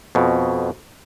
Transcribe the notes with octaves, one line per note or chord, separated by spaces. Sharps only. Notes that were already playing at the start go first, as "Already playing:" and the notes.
F2 B2